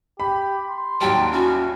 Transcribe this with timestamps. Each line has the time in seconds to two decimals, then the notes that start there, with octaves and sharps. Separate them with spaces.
0.20 G4 B5
0.69 C6
1.01 D#2 F#3 G3 G5 A5
1.32 C#4 E4 F#4